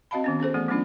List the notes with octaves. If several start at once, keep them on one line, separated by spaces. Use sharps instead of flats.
C4 F#4 D#5 F5 A5 B5
D#3 B3 C#4
C#4 G#4 A4 C5
E3 A3 B3 G#4
F#3 A3 B3 C#4 D4 F4